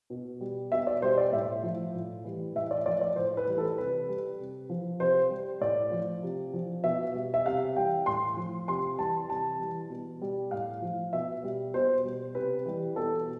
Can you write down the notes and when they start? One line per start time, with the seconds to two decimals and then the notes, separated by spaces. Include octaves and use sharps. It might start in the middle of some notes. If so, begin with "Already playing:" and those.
0.10 B2
0.41 G3
0.72 B2 E5
0.87 D5
1.02 G3 C5
1.18 D5
1.32 A2 E5
1.63 F3
1.95 A2
2.24 E3 G3
2.55 A2 E5
2.71 D5
2.86 F3 D5
3.01 D5
3.16 A2 C5
3.37 B4
3.47 E3 G3
3.58 A4
3.78 C3 B4
4.09 G3
4.39 C3
4.69 F3
5.00 C3 C5
5.30 G3
5.61 A2 D5
5.92 F3
6.23 C3
6.54 F3
6.84 B2 E5
7.15 G3
7.34 E5
7.46 C3 F5
7.76 E3 G3 G5
8.06 A2 C6
8.37 F3
8.68 C3 C6
8.98 E3 G3 A5
9.29 C3 A5
9.60 E3 G3
9.90 B2
10.22 G3
10.51 A2 F5
10.82 F3
11.13 B2 E5
11.43 G3
11.74 B2 C5
12.04 G3
12.35 C3 B4
12.66 E3 G3
12.96 B2 A4